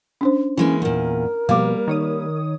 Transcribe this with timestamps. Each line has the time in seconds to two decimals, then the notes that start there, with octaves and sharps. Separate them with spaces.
0.21 C#4 D4 C5
0.57 E3 G#3 A#3 C#4 E4
0.82 E2 A#2 A#4
1.49 B2 F3 G3 A#3 B3 F5 D6
1.88 D#3 C#5 D#6